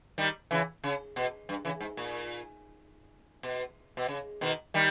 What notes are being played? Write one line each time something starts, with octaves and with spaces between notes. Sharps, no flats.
D#3 G3
C#3 E3
C#3
B2
G2
C#3 E3
G#2
A#2
B2
B2
C#3
B2 D#3
D#3 G3